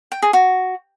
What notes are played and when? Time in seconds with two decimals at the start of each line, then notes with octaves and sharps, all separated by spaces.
0.12 G5
0.22 G#4
0.33 F#4